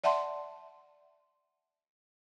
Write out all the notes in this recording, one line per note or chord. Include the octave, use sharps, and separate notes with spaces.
D5 E5 F#5 A5 C6